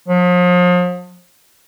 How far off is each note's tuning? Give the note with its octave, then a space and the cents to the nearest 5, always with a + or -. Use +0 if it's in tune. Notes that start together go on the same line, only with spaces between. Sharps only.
F3 +40